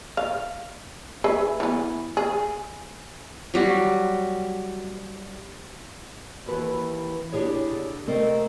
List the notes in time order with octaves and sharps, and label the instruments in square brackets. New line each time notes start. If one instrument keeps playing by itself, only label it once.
[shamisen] F5
G#4 B4 E5
E3 B3
G#4
[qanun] F#3 G3 F#4
[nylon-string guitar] D#2 E3 B4
D4 E4 G4 G#4 C#5
D3
C3 A3 C4 A#4 D#5